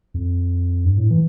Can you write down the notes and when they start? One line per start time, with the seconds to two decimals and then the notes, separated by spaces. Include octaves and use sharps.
0.14 F2
0.85 G2
0.97 A2
1.10 E3